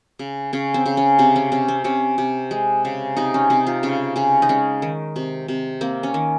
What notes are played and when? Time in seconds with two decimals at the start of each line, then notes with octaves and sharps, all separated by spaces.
0.19 C#3
0.53 C#3 C#4
0.74 C4
0.86 C#3
0.97 C#4
1.19 C3 C4
1.36 C#4
1.52 C3 C#4
1.68 C4
1.84 C3 C#4
2.18 C3
2.51 G#3
2.85 C#3
3.16 C3 D#4
3.34 C#4
3.50 C3 D#4
3.67 F4
3.83 C#3 C#4
4.16 C#3 C#4
4.42 D#4
4.49 G#3 C#4
4.82 D#3
5.16 C3
5.48 C3
5.81 A#3 C4
6.03 C#4
6.14 D#3